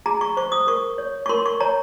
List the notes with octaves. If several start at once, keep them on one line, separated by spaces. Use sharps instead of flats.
G#4 A#5
C#6
C5 C#6
D#6
A#4 C#6
C#5
C#6
A#4 C6
C#6
C#5 A#5